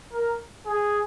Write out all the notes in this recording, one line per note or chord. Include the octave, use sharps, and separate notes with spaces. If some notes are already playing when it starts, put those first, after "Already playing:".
A#4
G#4